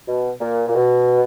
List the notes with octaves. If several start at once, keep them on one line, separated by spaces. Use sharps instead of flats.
B2
A#2
A#2
B2